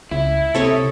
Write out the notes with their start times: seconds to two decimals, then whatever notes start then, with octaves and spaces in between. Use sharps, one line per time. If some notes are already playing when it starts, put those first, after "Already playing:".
0.11 C#2 E4
0.55 C3 A4 C#5 D#5